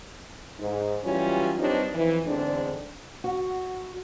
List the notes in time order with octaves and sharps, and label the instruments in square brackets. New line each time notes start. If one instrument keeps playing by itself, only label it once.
[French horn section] G#2
E3 F#3 G3 C#4 F4 F#4
G2 G3 C4 D4 D#4 C#5
F2 E3
E2 G#2 D3 C4 D4
[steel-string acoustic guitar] F#4